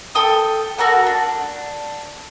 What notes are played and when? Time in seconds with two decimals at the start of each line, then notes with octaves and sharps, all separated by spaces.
0.15 A4 G5 D#6
0.78 F#4 A4 A#4 F#5
1.06 D4